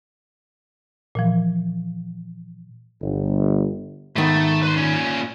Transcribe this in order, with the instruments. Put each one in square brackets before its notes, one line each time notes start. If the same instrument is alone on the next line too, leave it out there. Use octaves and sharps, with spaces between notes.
[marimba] A#2 E3 F3
[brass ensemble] G1
[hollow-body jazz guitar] G#2 D#3 B3 [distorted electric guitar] A3
[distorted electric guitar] B4 C6
A#2 C#4